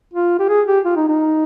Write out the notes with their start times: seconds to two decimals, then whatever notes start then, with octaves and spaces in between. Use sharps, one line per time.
0.13 F4
0.39 G4
0.49 G#4
0.67 G4
0.85 F4
0.96 D#4
1.08 D#4